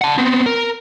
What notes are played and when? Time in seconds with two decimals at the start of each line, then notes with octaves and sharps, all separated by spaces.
0.01 F#5 A5
0.18 B3 C4
0.46 A#4